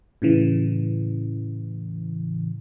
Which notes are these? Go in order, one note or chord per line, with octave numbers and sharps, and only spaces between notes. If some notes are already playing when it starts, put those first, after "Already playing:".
A2 C#3 E3